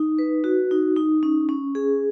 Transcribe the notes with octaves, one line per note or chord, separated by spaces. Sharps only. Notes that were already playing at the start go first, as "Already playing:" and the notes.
Already playing: D#4
B4
F#4
D#4
D#4
C#4
C#4
G#4